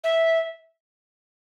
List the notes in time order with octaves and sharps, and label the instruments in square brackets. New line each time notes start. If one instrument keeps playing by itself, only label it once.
[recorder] E5